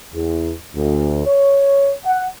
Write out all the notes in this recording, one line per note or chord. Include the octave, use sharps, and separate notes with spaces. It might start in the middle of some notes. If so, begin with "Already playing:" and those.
E2
D2
C#5
F#5